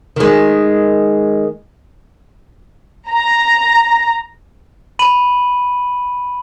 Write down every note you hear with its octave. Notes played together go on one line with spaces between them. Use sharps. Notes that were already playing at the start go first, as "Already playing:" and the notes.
D#3 G#3
A#5
B5 D#7 F#7